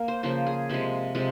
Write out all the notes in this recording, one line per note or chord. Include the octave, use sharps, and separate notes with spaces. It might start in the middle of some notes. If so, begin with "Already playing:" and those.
Already playing: A#3
C5
C#3 F3 A#3 C5
G#4
C3 F3 G#3
C3 F3 G#3